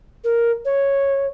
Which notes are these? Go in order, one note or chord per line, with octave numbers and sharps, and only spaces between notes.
A#4
C#5